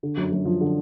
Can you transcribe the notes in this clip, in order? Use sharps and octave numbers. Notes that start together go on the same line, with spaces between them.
D3
F#2
F#2
F3
D3